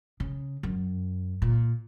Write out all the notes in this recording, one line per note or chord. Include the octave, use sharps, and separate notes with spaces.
C#3
F#2
A#2